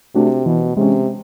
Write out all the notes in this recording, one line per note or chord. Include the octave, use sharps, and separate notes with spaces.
C3 A3 D4 F#4
B2 E3
C3 G#3 C#4